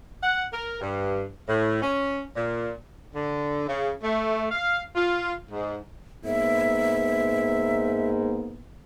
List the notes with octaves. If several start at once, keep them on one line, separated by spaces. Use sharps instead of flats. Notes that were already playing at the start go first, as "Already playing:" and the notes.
F#5
A#4
G2
A2
C#4
A#2
D3
C#3
A3
F5
F4
G#2
G#2 A#3 B3 E5